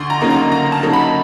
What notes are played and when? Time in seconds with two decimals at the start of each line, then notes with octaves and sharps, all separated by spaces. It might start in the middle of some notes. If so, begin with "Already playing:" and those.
Already playing: D2 C6
0.10 A#5
0.21 C#3 F#3 A#3 D#4
0.30 A#5
0.52 D2 A#5
0.72 A5
0.83 C#3 F#3 A#3 D#4
0.93 B5